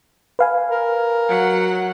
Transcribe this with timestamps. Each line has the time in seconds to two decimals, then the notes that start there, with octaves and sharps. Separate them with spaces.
0.39 B4 F5 G#5
0.71 A#4
1.28 F#3 F#5